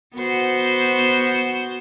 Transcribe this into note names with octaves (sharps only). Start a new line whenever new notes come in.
B3 F#4 C5